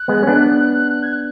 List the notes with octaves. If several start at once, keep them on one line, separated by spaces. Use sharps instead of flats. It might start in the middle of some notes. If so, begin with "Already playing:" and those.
Already playing: F#6
G#3 B3
C#4
B3 D4
G#6
F#6